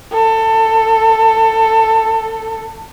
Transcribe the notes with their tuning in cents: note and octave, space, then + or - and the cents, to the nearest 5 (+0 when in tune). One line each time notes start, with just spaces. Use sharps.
A4 +20